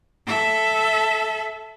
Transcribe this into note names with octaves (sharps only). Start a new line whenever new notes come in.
A4 E5